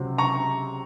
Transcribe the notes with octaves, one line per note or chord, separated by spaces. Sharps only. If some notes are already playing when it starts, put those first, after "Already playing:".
Already playing: C#2 C3 F#3 C4
A#5 C#6